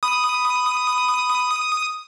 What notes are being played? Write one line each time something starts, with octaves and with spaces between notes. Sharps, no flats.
B5 D#6